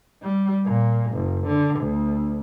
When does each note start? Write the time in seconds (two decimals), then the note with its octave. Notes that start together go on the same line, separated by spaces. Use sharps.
0.22 G3
0.65 A#2
1.13 F#1
1.47 D3
1.81 D2